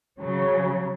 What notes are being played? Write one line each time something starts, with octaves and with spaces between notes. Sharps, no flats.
C#3 F#3